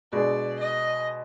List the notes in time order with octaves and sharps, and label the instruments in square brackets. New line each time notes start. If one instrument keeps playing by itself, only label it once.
[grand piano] B2 G#3 D4 G#4 [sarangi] D5
[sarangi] D#5